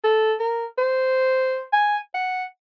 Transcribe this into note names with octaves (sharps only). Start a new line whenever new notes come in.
A4
A#4
C5
G#5
F#5